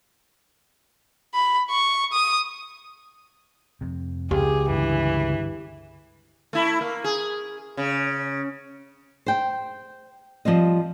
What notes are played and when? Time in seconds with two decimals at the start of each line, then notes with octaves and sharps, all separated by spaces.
1.34 B5
1.70 C#6
2.12 D#6
3.81 F2 C3
4.31 C#2 G4 G#4
4.70 G2 D3 E3
6.53 A3 E4
6.81 A#3
7.04 G#4
7.77 C#3
9.26 C5 G5
10.45 F3 G3 C4 D#5